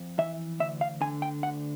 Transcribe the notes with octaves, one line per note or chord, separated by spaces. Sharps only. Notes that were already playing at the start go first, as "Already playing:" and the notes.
Already playing: F2
E3 E5
D2 E5
F5
D3 G#5
G5
D2 F#5